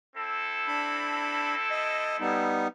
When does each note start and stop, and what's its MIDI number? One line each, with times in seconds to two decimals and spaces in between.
0.16 2.50 60
0.16 2.50 64
0.16 2.50 69
0.68 1.55 62
0.68 1.55 83
1.71 2.17 75
2.20 2.68 55
2.20 2.68 59
2.20 2.68 63